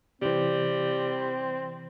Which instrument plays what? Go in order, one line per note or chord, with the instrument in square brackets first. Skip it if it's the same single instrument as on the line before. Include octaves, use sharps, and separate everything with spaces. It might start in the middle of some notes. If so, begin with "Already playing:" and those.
[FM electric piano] C3 E3 [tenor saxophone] G3 [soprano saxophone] C4